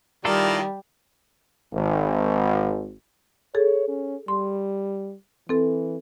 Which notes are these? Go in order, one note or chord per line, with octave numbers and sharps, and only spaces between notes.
D#3 G3 E4 F4 A4 A#4 D5
G#1
G#4 A4 C#5
C#4
G3 C6
E3 C4 A4